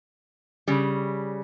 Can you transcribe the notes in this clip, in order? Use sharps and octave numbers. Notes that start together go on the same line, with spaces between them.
C#3 G3